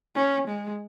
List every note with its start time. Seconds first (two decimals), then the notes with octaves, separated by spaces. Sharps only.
0.15 C#4
0.47 G#3